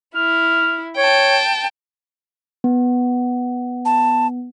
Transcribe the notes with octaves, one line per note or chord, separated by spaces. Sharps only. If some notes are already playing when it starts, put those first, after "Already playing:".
E4 F6
C#5 G5 A5
B3
A5